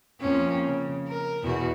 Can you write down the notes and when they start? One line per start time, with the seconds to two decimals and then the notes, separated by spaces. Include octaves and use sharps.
0.21 F2 A#3 C#4
0.67 C#3
1.08 A#4
1.43 E2 B2 F#4